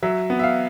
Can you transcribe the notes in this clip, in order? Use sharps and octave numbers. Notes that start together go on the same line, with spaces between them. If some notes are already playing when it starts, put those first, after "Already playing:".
F#3 E5
B3
E5
F5